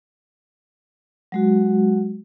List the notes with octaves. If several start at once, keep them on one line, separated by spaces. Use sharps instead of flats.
F#3 G#3 F#4